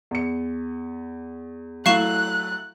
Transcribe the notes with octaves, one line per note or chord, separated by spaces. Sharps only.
E2 C#7
F#3 A3 E4 F5 C#6 F#6 E7